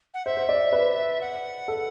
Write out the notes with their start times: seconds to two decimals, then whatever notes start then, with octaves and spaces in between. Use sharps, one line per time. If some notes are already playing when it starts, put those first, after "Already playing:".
0.14 F#5
0.26 C5 E5
0.37 C5
0.49 D5
0.73 B4
1.21 F#5
1.68 A4